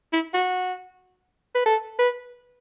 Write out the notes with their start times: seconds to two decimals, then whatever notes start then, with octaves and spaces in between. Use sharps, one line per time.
0.13 E4
0.34 F#4
1.55 B4
1.66 A4
1.99 B4